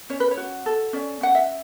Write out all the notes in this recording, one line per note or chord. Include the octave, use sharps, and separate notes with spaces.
C#4 C#5
B4
C#5
F#4
A4
C#4 D5
C#4 F#5
E5